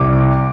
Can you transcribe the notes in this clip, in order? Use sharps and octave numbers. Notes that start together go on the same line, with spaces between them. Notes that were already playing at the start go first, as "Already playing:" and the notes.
Already playing: C2 D6